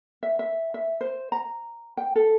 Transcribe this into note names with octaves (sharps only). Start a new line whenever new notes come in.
E5
E5
E5
C5
A#5
G5
A4